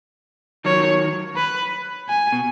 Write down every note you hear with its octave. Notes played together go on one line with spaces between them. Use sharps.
D#3 F#3 C#5
B4
G#5
B2